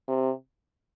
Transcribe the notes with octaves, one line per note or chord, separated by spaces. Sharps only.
C3